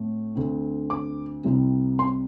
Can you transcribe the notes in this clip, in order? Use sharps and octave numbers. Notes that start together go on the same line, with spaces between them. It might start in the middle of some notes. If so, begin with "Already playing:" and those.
Already playing: A2 A3 C4
D2 D3 C4
D6
C2 C3 G3 C4
C6